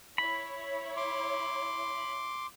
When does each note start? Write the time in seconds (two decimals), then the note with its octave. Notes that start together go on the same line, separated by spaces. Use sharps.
0.18 E4 C#5 B5
0.97 C6 D6